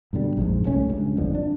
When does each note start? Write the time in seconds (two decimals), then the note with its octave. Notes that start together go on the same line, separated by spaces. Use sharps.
0.13 G2 B2 D3 G3
0.37 A#1 F2 G#2
0.64 C2 A3 C#4
0.89 C#2 G2
1.16 G1 F2 D3
1.35 D4